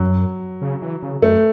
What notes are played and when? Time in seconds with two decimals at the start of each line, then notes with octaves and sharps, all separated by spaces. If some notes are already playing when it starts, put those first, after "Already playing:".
Already playing: F#2 F#3
0.62 C#3
0.82 E3
1.02 C#3
1.22 F#2 A3